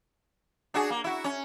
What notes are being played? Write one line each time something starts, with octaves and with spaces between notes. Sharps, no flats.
D4 F#4 G#4
A#3
E4 F#4
C#4